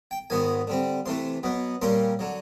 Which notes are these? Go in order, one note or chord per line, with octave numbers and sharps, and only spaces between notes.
G5
G#2 D#3 F#3 B3 G#5
D3 G3 C4
C3 E3 A3 C6
B2 F#3 B3
A#2 G3 A#3 C#4 C6
D3 F#3